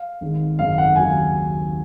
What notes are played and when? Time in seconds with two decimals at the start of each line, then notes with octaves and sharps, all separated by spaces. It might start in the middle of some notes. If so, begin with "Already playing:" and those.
Already playing: F5
0.21 G#1 G#2 D#3 G#3
0.59 G#1 F#2 C#3 F5
0.78 F#5
0.96 D#2 C#3 F#3 G#5